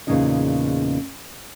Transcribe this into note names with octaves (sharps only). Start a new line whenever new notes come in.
E2 A#2 C#3 C#4 D#4 D#5